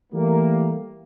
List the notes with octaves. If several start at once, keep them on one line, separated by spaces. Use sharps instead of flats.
E3 G3 A3 A#3